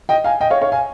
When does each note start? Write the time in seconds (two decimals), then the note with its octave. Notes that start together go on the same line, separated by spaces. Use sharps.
0.09 D#5 G5
0.24 F5 G#5
0.41 D#5 G5
0.50 C#5 F5
0.62 C#5 F5
0.72 F5 G#5